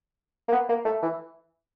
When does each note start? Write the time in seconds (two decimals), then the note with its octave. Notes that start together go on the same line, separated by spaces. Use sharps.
0.48 A#3
0.52 B3
0.69 A#3
0.85 A3
1.03 E3